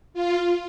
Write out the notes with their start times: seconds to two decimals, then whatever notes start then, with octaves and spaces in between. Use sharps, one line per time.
0.14 F4